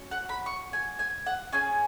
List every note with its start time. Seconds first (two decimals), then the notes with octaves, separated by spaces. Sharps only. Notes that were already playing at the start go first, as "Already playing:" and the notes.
Already playing: C#4 F#4
0.11 F#5
0.29 B5
0.46 C#6
0.73 G#5
0.99 G#5
1.26 F#5
1.52 C#4 G#4 G#5